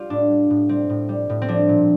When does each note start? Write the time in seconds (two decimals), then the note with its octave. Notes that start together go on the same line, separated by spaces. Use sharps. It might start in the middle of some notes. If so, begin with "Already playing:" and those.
Already playing: G3 F4 G4
0.10 A2 D4
0.31 G3
0.50 A2
0.69 G3 C4
0.90 A2
1.09 G3
1.29 A2
1.42 C4
1.48 F3 D4
1.69 A#2